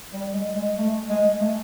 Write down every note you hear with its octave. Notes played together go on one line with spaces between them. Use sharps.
G3
G#3
G#3
A3
G#3
A3